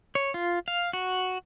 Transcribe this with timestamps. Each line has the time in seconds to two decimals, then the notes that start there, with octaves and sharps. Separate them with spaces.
0.15 C#5
0.34 F4
0.68 F5
0.93 F#4